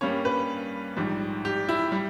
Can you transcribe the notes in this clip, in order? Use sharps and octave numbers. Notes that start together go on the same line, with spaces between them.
G2 G3 A#3 C#4 C#5
B4
A#1 G#2 G3
G4
E4
G3